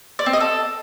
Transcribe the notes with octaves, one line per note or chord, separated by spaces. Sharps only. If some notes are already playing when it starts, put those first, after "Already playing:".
D5
C4
D#5
A4